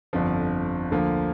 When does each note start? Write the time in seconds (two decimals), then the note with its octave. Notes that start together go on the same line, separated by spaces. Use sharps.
0.13 G1 F2 D3 F3
0.91 D2 D3 F3 A#3